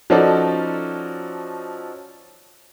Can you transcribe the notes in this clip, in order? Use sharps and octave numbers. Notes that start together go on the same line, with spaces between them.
F3 C#4 D#4 F#4 A4 D5